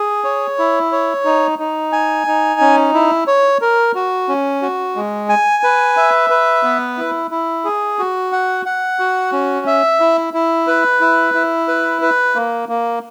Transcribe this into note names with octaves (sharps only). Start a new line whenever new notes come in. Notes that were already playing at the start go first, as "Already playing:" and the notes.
Already playing: G#4
C#5
E4
C#5
D#4
D#4
G#5
D#4
C#4
E4
C#5
A#4
F#4
C#4
F#4
G#3
G#5
B4
E5
B4
B3
E4
E4
G#4
F#4
F#5
F#5
F#4
C#4
E5
E4
E4
B4
E4
E4
B4
B4
A#3
A#3